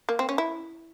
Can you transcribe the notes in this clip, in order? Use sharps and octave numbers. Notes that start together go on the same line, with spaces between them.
A#3
C4
C#4
E4